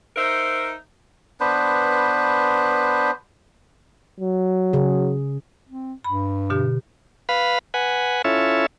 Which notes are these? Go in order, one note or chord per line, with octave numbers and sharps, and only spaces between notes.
D#4 A#4 C5 E5
B3 D4 B4 C5
F#3
C#3 G#4
C4
G2 B5
B2 D3 G4
B4 F5 B5
B4 F#5 G#5
C#4 E4 F4 A4 C#5 E5